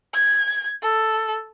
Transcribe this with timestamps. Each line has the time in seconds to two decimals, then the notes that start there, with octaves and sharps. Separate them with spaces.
0.14 G#6
0.82 A4